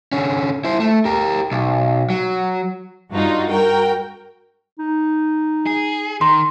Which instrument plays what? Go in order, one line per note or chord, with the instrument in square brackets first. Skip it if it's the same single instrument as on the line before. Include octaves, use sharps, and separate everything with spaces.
[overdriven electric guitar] D3 C#4
E4 C5
A3
G4 A#4
B1
F#3
[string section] G2 D#4 F4 F#4
F#4 A#4 G5
[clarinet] D#4
[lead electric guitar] G#4
[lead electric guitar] D#3 [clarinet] A#5 [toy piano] C6